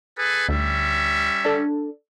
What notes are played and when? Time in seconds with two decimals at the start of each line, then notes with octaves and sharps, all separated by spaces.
0.17 G#4 A4 B4
0.49 D2 G3 C#4 E5
1.45 D4 A4